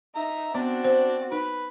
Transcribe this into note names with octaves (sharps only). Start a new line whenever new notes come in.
D#4 E5 A#5
B3 C4 D4 F#4 D5
C5
D#4 B4